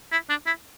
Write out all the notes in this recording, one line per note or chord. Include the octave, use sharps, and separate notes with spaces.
E4
D4
E4